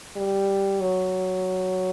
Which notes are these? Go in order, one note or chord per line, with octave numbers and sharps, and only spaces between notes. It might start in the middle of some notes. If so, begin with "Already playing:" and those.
G3
F#3